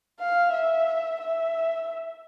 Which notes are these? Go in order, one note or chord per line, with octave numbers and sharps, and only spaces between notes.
F5
E5
E5